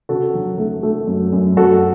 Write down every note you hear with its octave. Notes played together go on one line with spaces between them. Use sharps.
C#3 F#4 A4
F#3
A3
A3
F#2
F#2
F#2 F#4 A4